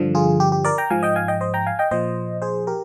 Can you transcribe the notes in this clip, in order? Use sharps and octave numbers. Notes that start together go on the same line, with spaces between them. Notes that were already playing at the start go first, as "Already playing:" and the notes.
Already playing: G2 D3 F3
F4 G#4
G4
G4
A#4 D5
G5 A#5
G#2 F3 F5 G#5
D#5 G5
F5 G#5
D#5 G5
C5 D#5
G5 A#5
F5 G#5
D#5 G5
A#2 F3 C5 D#5
G#4 C5
G4 A#4